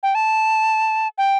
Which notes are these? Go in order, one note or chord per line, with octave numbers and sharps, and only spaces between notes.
G5
A5
G5